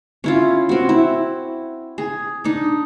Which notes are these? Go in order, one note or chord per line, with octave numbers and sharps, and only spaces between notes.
C#4 E4 F4
C4 F#4
E4
G#4
D4 D#4